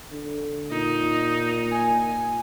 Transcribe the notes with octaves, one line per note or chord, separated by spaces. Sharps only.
D3
A#2 D#4
G#5